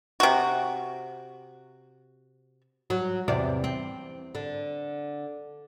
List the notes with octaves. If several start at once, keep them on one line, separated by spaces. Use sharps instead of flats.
C3 F#4
F#3
E2 C3 D5
C4
D3